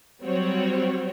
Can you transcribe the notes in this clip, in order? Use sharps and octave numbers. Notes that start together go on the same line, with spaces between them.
F#3 G3 C4 F#4 C#5